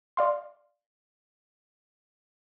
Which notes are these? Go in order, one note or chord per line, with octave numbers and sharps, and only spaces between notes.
D5 F5 C6